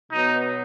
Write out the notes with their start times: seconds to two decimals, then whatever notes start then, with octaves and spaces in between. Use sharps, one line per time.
0.12 B2 F#3 B3 D#4